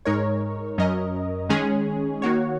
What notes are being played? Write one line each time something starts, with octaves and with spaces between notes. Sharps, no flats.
G#2 G#3 D#4 A#4 C#5
F#2 F#3 C#4 A#4 D#5
D#3 G#3 C#4 G#4
D#3 A#3 F#4 C#5